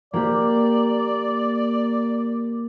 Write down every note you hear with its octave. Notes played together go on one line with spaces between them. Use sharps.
A#3 G4 D5